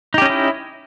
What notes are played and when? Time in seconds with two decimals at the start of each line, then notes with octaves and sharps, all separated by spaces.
0.14 D#4
0.18 G4
0.22 C#4
0.26 D#5
0.29 E4